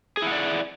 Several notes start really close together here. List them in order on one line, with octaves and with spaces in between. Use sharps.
G#4 E4 F#5 D5